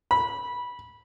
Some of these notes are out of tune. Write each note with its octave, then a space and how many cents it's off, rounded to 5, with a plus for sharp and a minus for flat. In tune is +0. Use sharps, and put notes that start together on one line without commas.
B5 -15